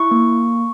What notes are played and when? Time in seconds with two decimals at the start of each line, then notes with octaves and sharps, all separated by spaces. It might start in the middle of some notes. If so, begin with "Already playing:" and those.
Already playing: E4 C#6
0.11 A#3